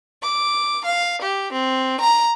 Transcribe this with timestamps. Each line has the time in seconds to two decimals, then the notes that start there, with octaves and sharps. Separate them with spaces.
0.23 D6
0.86 F5
1.22 G4
1.52 C4
2.01 A#5